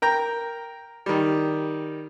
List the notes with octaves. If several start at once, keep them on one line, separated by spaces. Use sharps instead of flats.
A#4 G5 A#5
D#3 G3